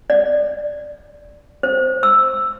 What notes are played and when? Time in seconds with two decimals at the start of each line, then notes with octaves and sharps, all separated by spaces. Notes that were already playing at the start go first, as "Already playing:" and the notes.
0.10 D5
1.63 C5
2.03 E6